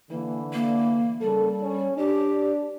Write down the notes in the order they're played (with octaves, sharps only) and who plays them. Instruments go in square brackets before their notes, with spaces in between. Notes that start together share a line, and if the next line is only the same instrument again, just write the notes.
[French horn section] D3 E3 [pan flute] A#3
[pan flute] A#3
[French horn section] C#3 A#3 A4 [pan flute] G3
[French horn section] C#4
[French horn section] D4 [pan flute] G4